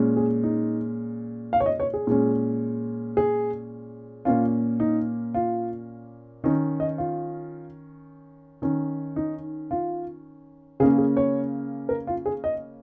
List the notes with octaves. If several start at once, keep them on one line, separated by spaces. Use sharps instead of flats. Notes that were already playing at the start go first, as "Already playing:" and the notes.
Already playing: A#2 G#3 C#4
G#4
D#4
F5
C#5
D#5
C#5
G#4
A#2 G#3 C#4
G#4
A#2 A#3 C#4 F4
D#4
F4
D#3 C#4 D#4
D#5
F4
D#3 C#4
D#4
F4
C#3 A#3 C#4 G#4
G#4
C#5
A#4
F4
G#4
D#5